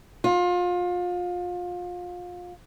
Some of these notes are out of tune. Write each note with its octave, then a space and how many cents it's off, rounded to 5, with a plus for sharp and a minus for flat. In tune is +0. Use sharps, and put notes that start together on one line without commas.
F4 +30